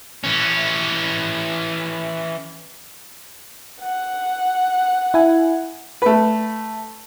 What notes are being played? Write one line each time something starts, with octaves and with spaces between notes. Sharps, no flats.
E3 C#4
F#5
E4 G#5
A3 B4